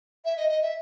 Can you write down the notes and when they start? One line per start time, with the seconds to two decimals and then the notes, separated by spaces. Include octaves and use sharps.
0.25 E5
0.37 D#5
0.49 D#5
0.62 E5